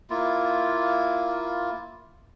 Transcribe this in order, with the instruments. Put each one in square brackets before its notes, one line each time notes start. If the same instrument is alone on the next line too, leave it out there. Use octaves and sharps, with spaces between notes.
[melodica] A#3 E4 F4